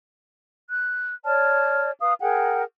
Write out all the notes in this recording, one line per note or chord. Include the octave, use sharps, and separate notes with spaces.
F#6
C#5 D5 A5 F6
B4 F5 D#6
G#4 A#4 F#5 G5